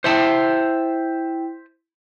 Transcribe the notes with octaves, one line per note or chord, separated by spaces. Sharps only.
E4 C5 E5 G5 A5